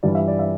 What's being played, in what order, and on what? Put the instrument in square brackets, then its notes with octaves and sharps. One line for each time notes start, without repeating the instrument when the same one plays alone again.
[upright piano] G2 E3 G3 D5
E5
D5
E5